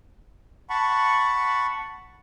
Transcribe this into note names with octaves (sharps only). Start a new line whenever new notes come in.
F#5 A5 B5 C#6